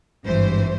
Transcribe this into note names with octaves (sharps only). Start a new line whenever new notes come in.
G#1 G2 E3 C5